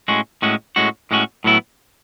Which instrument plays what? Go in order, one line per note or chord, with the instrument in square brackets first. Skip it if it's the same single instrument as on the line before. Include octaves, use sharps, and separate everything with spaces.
[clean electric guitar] A2 G#3 C#4 F#4
A2 G#3 C#4 F#4
A2 G#3 C#4 F#4
A2 G#3 C#4 F#4
A2 F#3 B3 E4